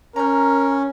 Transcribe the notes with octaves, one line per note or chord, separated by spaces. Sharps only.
C#4 A#4 A#5 G6